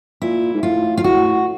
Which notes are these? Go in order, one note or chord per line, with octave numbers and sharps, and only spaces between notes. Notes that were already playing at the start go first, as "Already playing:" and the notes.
A#2 E4
G#2
A2 F4
F4
A2 F#4